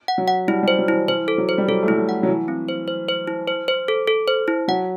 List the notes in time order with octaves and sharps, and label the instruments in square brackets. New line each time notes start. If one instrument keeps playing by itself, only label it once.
[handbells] F#5
[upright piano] F#3
[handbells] F#5
[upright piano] G3 [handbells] E4
[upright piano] G3
[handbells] C5
[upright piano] F#3
[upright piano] E3 [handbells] E4
[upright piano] E3 [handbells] C5
[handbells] A4
[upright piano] F#3
[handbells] C5
[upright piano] G3
[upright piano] F#3 [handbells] A4
[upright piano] A3
[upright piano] G3 [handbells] E4
[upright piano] F#3
[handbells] F#5
[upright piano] F#3
[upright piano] E3 [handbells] E4
[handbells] C4
C5
C5
C5
E4
C5
C5
A4
A4
C5
E4
[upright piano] F#3 [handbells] F#5